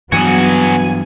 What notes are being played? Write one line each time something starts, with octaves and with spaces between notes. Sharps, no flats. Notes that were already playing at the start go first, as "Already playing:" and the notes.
G2 E3 F#3 B3 F#4 G#4 G#5